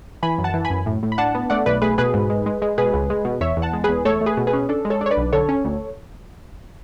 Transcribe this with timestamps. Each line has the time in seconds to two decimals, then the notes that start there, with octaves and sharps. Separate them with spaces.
0.23 E3 G#5 B5
0.38 F#2
0.44 F#5 A5
0.54 E3
0.65 G#5 B5
0.70 F#2
0.86 A2
1.03 A2
1.12 B5
1.18 D4 F#5 A5
1.35 B3
1.50 A3 D5 F#5
1.66 B1 B4 D5
1.82 A3 G#4 B4
1.98 B2 G#4 B4
2.14 G#2
2.30 G#3
2.46 G#3
2.62 G#3
2.78 B2 G#4 B4
2.94 C#2
3.10 G#3
3.25 B2
3.41 E2 C#5 E5
3.57 E2
3.62 F#5 A5
3.73 G#3
3.84 E2 G#4 B4
4.05 A3 A4 C#5
4.21 A3
4.26 G#4 B4
4.37 B2
4.47 G#4 B4
4.53 C#4
4.69 D4 A4
4.85 G#3
4.90 A4 C#5
5.01 D4
5.06 C#5
5.11 B4 D5
5.17 B1
5.33 D3 A4 C#5
5.49 C#4
5.65 D2